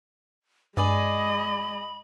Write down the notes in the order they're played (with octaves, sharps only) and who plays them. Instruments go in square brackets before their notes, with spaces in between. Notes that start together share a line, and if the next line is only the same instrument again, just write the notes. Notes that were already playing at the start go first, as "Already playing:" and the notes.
[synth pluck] G2 [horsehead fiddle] G#3 D#5 [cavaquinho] G#4 D5 D#6 [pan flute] B5